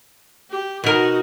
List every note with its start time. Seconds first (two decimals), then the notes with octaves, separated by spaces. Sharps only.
0.50 G4
0.84 B2 D#4 F#4 A#4